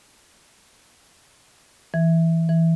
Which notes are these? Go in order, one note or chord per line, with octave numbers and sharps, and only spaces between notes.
E3
E3